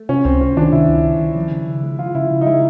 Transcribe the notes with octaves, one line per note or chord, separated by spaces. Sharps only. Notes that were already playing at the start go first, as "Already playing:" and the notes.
Already playing: A3
C3 C#4
C#2 C4
C#2 C#4
D#3 D4
C3 E4
C#2
C#2
D#3
F3
C#3
C#3
G#3
F3 F4
C#3 E4
C#3
D#4
G#3 E4